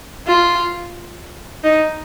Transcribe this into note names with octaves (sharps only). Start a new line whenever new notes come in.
F4
D#4